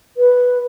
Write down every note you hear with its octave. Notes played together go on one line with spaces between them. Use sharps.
B4